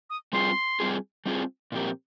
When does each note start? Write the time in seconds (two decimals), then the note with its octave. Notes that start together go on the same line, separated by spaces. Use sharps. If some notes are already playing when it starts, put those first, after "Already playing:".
0.10 D#6
0.33 G3 C4 F4 G#4 C6
0.80 G3 C4 F4 G#4
1.26 G3 C4 F4 G#4
1.72 A#2 F3 C4 G4 A#4